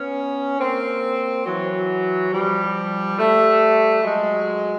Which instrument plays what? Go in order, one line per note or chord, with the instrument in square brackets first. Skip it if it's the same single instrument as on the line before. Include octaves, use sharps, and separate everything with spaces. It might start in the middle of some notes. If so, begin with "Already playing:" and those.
Already playing: [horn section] B3 C#4
A#3 C4
E3 F#3
F3 G3
G3 A3
F#3 G#3